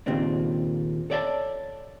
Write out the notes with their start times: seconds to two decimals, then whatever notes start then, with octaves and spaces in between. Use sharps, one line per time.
0.06 D#2 A#2 C#3 C4 D4
1.10 A4 C#5 D5 E5 F#5 A5